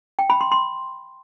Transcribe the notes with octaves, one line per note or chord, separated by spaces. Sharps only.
G5
B5
C6
C6